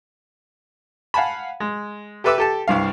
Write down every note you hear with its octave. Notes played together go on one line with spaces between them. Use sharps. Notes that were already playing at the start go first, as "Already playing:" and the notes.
F5 F#5 G#5 A5 B5
G#3
G4 A4 B4 E5 D6 E6
G4 A4 A5
C2 G2 F5